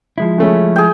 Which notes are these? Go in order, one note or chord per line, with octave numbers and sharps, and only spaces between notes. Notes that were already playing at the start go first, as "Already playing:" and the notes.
F3 G#3 E4
C#3 A3 C#4
G#4 G5